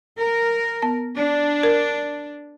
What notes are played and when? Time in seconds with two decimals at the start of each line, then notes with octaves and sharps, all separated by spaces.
0.18 A#4
0.82 B3 A5
1.17 D4
1.63 A#4